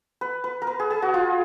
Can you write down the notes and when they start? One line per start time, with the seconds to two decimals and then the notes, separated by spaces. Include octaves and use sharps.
0.21 B4
0.44 B4
0.62 A#4
0.67 B4
0.80 G#4
0.90 G#4
1.02 F#4
1.14 F4